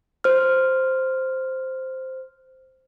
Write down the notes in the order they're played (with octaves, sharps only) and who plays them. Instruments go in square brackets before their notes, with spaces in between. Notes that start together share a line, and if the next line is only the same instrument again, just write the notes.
[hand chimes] C5 F6